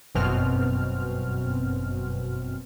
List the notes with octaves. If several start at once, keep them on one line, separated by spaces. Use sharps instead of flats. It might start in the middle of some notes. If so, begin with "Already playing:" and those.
G1 F#2 B2 C4 F6